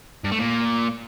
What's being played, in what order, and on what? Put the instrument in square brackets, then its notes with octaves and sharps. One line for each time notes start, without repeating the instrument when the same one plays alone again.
[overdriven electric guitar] G2
A3
A#2